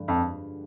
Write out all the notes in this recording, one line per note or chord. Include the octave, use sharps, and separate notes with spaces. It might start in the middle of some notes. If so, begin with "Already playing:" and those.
Already playing: G2 D3 F3 G#3
F2